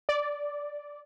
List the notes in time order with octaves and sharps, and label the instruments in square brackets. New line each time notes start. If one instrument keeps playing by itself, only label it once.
[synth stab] D5